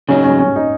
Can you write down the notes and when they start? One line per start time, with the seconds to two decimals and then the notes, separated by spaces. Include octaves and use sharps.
0.08 C#3 F#3 C#4 D#4
0.24 C#4
0.39 C#4
0.56 D#4